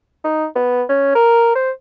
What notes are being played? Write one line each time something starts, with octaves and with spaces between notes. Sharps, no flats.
D#4
B3
C#4
A#4
C5